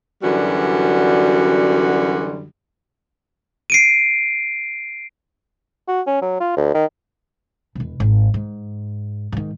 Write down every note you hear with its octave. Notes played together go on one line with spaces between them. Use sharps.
F#2 D3 E3 G3 F#4
C7 D7 D#7
F#4
C#4
F#3
F4
D2
D#3
E1 B2
G#1
G#2
G#2 D#3